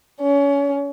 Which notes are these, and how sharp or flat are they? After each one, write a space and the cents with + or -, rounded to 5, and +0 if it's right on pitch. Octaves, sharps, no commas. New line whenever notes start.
C#4 +30